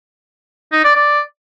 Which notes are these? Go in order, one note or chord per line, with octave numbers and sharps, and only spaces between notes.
D#4
D5
D5